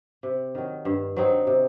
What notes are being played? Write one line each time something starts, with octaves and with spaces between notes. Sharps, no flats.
C3
D#3 F#3
G2
F#3 C4 D#4
C3